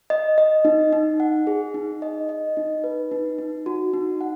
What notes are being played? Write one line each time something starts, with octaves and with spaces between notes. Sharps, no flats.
D#5
D#5
D#4
D#4
F#5
G#4
D#4
D#5
D#5
D#4
B4
D#4
D#4
F#4
D#4
F#5